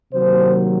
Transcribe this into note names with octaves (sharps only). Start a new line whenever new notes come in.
C3 D#3 F#3 A#3 C5